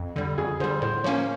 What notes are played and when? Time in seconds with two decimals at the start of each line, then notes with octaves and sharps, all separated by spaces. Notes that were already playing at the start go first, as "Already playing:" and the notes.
Already playing: F2
0.16 D3 G3
0.38 F2 G#4
0.60 D3 G3 C5
0.82 A2 C5
1.04 F3 A#3 C#4 C#5